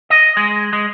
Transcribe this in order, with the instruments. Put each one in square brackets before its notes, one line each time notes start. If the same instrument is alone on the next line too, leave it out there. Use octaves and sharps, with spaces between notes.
[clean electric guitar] D#5
G#3
G#3